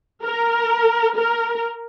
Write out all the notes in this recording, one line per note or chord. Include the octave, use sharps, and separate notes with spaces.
A#4
A#4